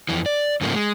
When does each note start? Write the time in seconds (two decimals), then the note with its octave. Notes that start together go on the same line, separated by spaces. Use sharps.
0.09 F2 E3
0.26 D5
0.61 G#2 C#3 F3 A3 A#3
0.73 G#3